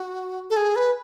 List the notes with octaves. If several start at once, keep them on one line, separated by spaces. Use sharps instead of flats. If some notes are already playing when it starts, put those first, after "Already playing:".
Already playing: F#4
A4
G#4
B4